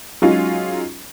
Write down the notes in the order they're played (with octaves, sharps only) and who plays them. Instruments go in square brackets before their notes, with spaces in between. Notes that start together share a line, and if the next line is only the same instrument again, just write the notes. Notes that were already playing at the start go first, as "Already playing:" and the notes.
[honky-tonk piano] F#3 G#3 C#4 D#4 F4